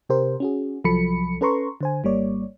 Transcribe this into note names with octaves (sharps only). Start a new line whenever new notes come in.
C3 G4 A#4 C5
C#4 F#4 G#4
C2 F3 F#3 A4 B5 C#7
C#4 A4 B4 A#5 C6 C#6
D3 C5 G#5
G#1 G3 A#3 C#5 D5